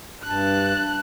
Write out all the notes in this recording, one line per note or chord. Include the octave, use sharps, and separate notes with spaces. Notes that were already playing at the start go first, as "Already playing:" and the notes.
G2 A5 F#6